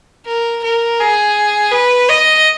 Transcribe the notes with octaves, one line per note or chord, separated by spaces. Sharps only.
A#4
A#4
G#4
B4
D#5